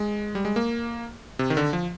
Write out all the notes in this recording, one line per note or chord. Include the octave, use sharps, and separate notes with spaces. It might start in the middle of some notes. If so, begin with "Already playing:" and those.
Already playing: G#3
G3
G#3
A#3
C3
D#3
D3
F3